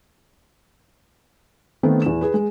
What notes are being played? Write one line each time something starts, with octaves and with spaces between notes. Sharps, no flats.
D#3 A3 B3 C4
E2 E7
G#4 B4
G#3